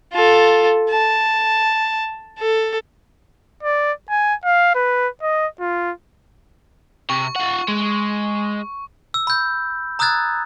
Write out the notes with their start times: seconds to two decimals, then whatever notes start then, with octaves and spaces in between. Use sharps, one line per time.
0.14 F4 A4
0.90 A5
2.39 A4
3.63 D5
4.10 G#5
4.45 F5
4.75 B4
5.22 D#5
5.60 F4
7.10 C3 C#6
7.36 F4 F#5
7.68 G#3
9.14 E6
9.27 B5 G6
9.99 A#5 D#6 E6 F#6 G#6 A6